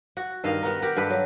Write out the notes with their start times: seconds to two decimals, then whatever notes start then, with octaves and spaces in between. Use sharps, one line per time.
0.17 F#4
0.44 G2 D#3 D#5 F5
0.63 B3 F#4 A#4
0.82 F#4 G4 A#4 F#5
0.97 G2 A4 B4
1.10 F#3